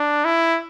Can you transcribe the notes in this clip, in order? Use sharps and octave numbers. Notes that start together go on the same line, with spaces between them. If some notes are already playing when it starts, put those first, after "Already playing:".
Already playing: D4
E4